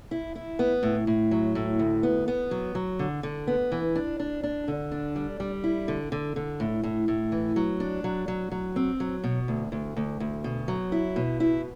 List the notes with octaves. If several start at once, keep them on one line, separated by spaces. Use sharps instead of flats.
E4
E4
B3
A2
A2
F#3
A2
D2
B3
B3
F#3
F#3
D3
D3
B3
E3
D4
D4
D4
D3
D4
G3
G3
E4
D3
D3
D3
A2
A2
A2
E3
F#3
D4
F#3
F#3
F#3
C4
F#3
B2
D2
D2
D2
D2
B2
F#3
E4
B2
E4